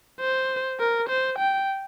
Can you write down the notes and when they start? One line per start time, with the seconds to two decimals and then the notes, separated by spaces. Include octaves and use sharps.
0.20 C5
0.80 A#4
1.09 C5
1.38 G5